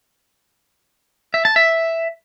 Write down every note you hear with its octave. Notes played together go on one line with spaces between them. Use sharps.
E5
A5
E5